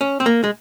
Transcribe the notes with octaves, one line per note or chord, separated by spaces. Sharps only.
C#4
C4
A#3
G#3